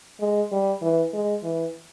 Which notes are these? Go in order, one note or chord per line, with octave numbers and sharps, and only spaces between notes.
G#3
G3
E3
G#3
E3